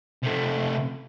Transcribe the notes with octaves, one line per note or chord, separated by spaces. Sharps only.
C3 A3